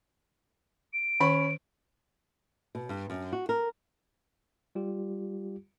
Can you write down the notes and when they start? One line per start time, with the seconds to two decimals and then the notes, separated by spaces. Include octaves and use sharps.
0.93 D7
1.20 D#3 C#4 B5 C#6
2.75 B2
2.89 G2
3.10 F#2
3.32 F#4
3.49 A#4
4.75 G3 F4 G4